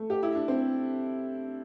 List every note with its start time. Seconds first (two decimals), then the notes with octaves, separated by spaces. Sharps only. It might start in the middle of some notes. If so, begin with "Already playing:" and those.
Already playing: A3
0.10 G4
0.23 E4
0.35 D4
0.48 C4